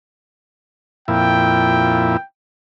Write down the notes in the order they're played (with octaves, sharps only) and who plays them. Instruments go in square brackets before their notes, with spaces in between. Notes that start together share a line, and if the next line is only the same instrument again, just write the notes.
[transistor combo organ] F2 A#2 E4 [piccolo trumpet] G5